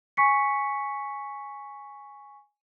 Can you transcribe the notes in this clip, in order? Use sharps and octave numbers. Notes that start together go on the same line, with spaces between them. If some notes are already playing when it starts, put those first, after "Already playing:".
G#5 C#6 B6 C#7